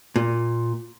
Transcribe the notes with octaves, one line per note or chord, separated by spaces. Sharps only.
A#2